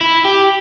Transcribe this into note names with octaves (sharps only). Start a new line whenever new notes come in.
E4
G4